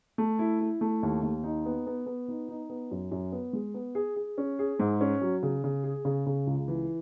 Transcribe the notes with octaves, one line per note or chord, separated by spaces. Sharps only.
A3
E4
E4
A3
D#2
D#2
D#4
B3
B3
B3
D#4
D#4
B3
F#2
F#2
B3
G#3
B3
G#4
G#4
C#4
G#4
G#2
C#4
F#3
C#3
C#3
G#4
C#3
C#3
C#2
E3